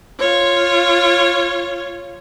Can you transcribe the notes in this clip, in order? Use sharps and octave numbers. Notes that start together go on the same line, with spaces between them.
F4 C#5